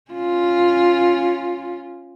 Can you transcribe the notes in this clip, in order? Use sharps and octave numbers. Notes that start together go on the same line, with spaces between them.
C#4 F4